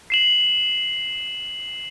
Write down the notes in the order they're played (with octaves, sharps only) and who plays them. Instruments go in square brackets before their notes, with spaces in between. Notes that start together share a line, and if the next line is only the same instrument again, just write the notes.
[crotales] C7 E7 F#7